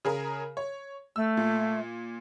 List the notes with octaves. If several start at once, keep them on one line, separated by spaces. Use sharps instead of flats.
C#3 G#4 A#4
C#5
A3 E6
A#2